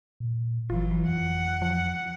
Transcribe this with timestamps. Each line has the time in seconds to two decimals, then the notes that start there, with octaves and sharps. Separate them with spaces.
0.20 A#2
0.70 G1 E3 F#3 F4
1.08 F2 F#5
1.62 F3